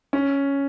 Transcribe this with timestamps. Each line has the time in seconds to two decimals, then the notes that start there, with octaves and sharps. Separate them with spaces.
0.13 C#4